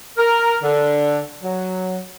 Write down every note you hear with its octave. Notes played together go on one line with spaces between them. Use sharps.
A#4
D3
F#3